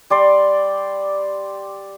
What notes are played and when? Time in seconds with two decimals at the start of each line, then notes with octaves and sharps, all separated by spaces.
0.10 G3 D5 C6